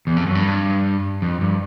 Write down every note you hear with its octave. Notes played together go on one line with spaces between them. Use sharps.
E2
F2
F#2
G2
F2
G2